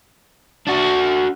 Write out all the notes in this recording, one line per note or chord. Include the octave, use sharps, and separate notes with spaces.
D4 F#4